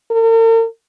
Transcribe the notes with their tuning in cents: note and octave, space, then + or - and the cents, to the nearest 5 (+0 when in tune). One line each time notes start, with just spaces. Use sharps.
A#4 -45